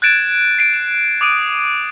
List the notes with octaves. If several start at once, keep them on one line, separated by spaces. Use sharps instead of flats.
F#6 G#6 A6 D7 E7
C7 D7
E7
D6 D#6 D7 D#7